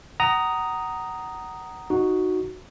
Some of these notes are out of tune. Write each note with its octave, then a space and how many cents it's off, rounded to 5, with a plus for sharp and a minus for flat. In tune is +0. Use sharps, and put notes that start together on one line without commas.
F#5 +30 A#5 +0 D#6 +0
D#4 +0 F#4 +0